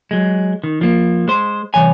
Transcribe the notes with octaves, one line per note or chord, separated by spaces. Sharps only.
F#3 G#3
D#3
F3 A#3
G#3 C5
C2 F2 E3 C#5 G#5